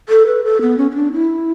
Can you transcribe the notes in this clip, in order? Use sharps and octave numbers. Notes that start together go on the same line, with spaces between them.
A4
B4
A4
B3
C#4
C#4
D4
E4